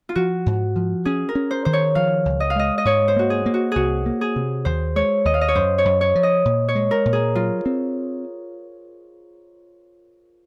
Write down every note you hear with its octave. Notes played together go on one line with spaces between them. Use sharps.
F4
F3 F#4
G#2
F3
C#4 G#4
A#4
C#4
C5
D#3 C5
C#5
F3 F5
C#2
D#5
F5
G#3 D#5
D#5
G#2 C#5
C5
A#3 F#4
G#4
A#3
F#4
C2 F#4 G#4
A#3
G#4
C3
D#2 C5
G#3 C#5
D#2 D#5
F5
D#5
C#5
F#2 C5
C#5
F#2
C#5
F3
D#5
A#2
C#5
G#3
A#4
A#2
G#4
F#3 F4
C4